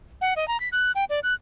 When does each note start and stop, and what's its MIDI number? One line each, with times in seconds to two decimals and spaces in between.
0.21 0.34 78
0.36 0.47 75
0.48 0.59 82
0.60 0.69 95
0.72 0.92 90
0.95 1.04 79
1.10 1.20 74
1.23 1.34 90